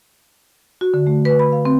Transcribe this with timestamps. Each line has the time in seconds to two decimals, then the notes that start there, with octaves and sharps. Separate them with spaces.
0.81 F#4
0.94 D3
1.07 A3
1.25 B4
1.39 B5
1.52 F5
1.65 C4